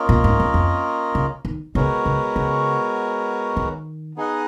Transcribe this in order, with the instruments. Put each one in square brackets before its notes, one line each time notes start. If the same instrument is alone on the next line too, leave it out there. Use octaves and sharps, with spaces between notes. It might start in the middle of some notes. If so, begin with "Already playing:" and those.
Already playing: [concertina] A#3 C#4 F4 A#4 D#5
[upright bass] A#2
G#2
G#2
F2
C#3
D#3
[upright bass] C#3 [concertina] G#3 B3 F#4 A#4 C#5
[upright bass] C#3
C#3
D#3
[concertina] B3 D#4 G#4 D#5 F#5